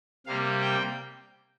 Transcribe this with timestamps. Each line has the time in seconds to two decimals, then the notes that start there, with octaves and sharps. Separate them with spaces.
0.26 C3 G3 A#3 F5
0.62 G5